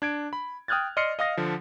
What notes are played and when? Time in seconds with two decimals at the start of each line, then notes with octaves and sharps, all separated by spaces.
0.02 D4 G#6 D7
0.33 B5
0.68 G5 D#6 F6 F#6 G#6 A6
0.97 D5 D#5 C6 F6 C7 C#7
1.19 D#5 F5 D#6 A#6
1.37 D3 F3